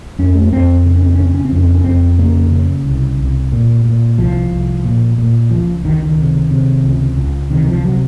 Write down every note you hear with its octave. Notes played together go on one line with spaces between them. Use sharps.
F2 C#4
A3
A#3
F2 C4
C#3 C4
C#4
C4
C#3 C#4
C4
C#4
C4
F2 C#4
C4
C#4
F2 C4
C#3 A#3
C#3
C2
C2
A#2
A#2
C2 F3
C2
A#2
A#2
C#2 F3
C#2 D#3
D#3
C3
C3
C#2
C#2
C3 D#3
F3
C3 F#3